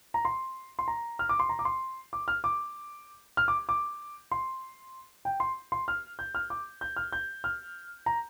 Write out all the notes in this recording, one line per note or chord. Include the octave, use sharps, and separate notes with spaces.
A#5
C6
C6
A#5
F6
D6
C6
A#5
D6
C6
D6
F6
D6
F6
D6
D6
C6
G5
C6
C6
F6
G6
F6
D6
G6
F6
G6
F6
A#5